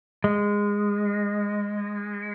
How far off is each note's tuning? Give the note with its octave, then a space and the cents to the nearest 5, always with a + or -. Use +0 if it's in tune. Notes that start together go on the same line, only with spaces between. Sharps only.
G#3 -15